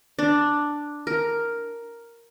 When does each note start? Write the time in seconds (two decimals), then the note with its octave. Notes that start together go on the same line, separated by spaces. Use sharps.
0.19 D4
1.07 A#4